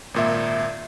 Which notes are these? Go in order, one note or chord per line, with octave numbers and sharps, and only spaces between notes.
G#1 A#2 E5